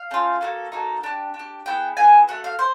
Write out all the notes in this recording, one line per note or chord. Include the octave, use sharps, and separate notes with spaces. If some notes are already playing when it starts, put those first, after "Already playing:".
Already playing: F5
A3 C#4 F4
A#3 D#4 F#4 A4
A#3 D#4 F#4 A4
D4 G4
D4
G4
B3 E4 G#4 G5
B3 E4 G#4 G#5
A3 D4 F#4 F#5
F5
C5